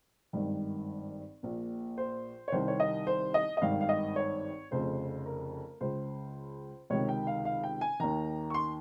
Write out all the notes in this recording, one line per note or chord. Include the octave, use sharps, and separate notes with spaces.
G#1 G2 D#3
A#1 A#2
C5
C#5
C2 C3 D#3 C5
C#5
D#5
C5
D#5
D#5
G#1 G2 D#3 F5
F5
D#5
C#5
F1 F2 C#3 C5
A#4
C#2 C#3 C5
C#2 C3 D#3 C#5
G5
F5
F5
G5
G#5
D#2 D#3 A#5
C#6
C6